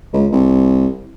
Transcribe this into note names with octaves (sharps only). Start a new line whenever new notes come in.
C#2
C2